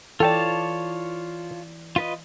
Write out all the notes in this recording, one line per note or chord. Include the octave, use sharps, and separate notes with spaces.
E3 F4 A4 C#5 D5 G5 A5
F4 B4 D#5